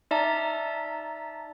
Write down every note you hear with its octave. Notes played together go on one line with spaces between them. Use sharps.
D#4 D5 E5 A5 A#5